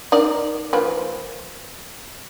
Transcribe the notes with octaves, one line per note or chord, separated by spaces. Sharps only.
D#4 A#4 D5
F3 A#3 B4